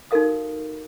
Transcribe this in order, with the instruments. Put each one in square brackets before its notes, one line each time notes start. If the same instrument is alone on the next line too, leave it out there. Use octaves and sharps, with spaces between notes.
[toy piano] D#4 F#4 A4 A#4 F5 D#6